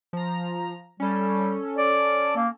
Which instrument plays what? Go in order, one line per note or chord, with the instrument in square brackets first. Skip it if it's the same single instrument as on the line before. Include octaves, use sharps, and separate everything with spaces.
[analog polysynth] F3 A#5
[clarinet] G3 [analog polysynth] C#4 A4
[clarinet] D5
A#3